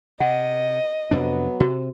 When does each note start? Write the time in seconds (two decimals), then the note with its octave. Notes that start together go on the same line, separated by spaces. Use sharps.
0.20 C3 D#5 F#5
1.11 F2 C3 F#3 B3 D4
1.60 C3 F#4